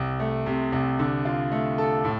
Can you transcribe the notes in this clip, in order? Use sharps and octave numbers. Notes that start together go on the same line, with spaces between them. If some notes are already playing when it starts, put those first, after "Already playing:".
Already playing: C2
A3
C3
C2
D3
F4
A3
A4
A2